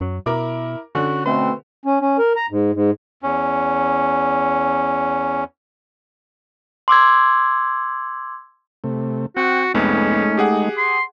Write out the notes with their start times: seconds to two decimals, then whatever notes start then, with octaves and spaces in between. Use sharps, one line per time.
0.01 F#2 F#3
0.26 B2 E4 A#4 D6
0.95 D3 C#4 F#4
1.26 B2 A3 C4 C5
1.86 C#4
2.00 C#4
2.19 A#4
2.36 A#5
2.51 G#2
2.74 G#2
3.23 E2 C#4
6.88 C6 D6 E6 G#6
8.84 C3 A3
9.36 C4 F#4 F#5 G5
9.74 C2 F2 G#3 A3 B3 C#4 D#4
10.37 G4 G#4 F#5
10.77 C6